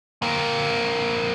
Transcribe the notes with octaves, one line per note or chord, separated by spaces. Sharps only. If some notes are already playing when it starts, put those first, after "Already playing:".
A#3 C4